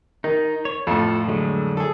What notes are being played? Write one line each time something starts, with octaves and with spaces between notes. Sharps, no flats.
D#3 D#4
C#5
F2 A2 F4 A4
D3 F#3 G#3
G#4 A4